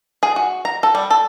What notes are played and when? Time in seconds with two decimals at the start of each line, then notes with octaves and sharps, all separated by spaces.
0.23 G#4
0.36 F#4
0.65 A#5
0.83 A4
0.95 G3
1.11 A4